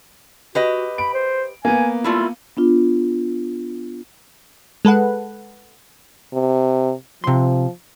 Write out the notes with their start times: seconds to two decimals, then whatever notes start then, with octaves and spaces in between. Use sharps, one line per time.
0.55 F#4 G4 B4 D#5
0.98 B5 D7
1.14 C5
1.65 A#3 B3 G#5
2.04 G3 A3 E4 F4
2.57 B3 D4 F4
4.85 G#3 A4 B4 F#5
6.34 C3
7.24 C3 F3 C6